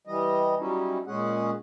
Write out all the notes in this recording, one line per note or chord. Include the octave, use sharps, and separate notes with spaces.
E3 G3 D#5
F#3 G3 C#4 D#4 E4
A#2 G#3 C#4 G#4 F#5